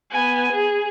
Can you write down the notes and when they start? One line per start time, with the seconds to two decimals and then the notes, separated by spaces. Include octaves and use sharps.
0.10 B3 G#5
0.52 G#4